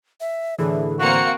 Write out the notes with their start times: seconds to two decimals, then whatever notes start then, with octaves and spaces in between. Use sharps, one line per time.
0.20 E5
0.59 A2 D3 E3 G#4
1.00 A#3 C4 F#4 F5 C#7